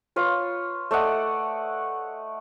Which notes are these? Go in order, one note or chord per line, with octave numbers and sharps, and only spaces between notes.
F4 B4 C#5
A3 D5 D#5 F#5